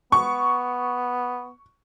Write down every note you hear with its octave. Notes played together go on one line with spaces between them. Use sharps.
B3 C#6